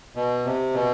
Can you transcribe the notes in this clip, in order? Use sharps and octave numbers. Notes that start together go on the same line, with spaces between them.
B2
C3
B2